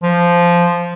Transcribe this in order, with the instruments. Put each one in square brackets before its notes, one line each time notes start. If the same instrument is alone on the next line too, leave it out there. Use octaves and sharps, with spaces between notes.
[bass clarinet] F3